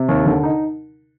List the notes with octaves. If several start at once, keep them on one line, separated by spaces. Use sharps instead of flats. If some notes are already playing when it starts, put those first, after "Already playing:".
Already playing: C3
D#2
D3
D#4